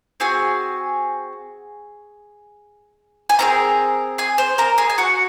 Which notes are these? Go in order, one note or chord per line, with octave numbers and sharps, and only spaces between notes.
C4 F#4 G#4 G#5
G#5
C4 F4 G#4 A#4 A#5
G#4 G#5
C5
A#4 A#5
G#4 G#5
G#5
F#4 F#5